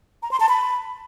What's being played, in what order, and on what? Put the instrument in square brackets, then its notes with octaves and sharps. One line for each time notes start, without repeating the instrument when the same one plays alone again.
[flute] A#5
C6
A5
B5